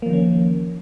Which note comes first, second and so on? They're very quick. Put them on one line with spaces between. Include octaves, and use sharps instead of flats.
A#3 F3 D#3 C#4